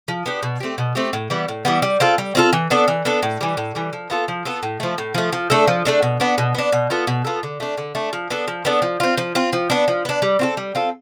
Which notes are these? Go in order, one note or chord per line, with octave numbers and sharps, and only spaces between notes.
F3
B3 D4 G4
B2
A3 C4 G4
B2
A3 C4 G4
A2
E3 G3 B3
A2
E3 G3 B3
G3
C4 F4 A4
G3
C4 F4 A4
E3
B3 D4 A4
E3
B3 D4 A4
A2
E3 G3
A2
E3 G3
F3
B3 F4 A4
F3
B3 F4 A4
A2
F3 A3
A2
F3 A3
F3
A3 D4 A4
F3
A3 D4 A4
B2
B3 D4
B2
B3 D4
B2
B3 F4 A4
B2
B3 F4 A4
D3
A3 D4
D3
A3 D4
F3
B3 D4 A4
F3
B3 D4 A4
F3
C4 F4
F3
C4 F4
F3
B3 D4
F3
B3 D4
G3
C4 F4 A4
G3
C4 F4 A4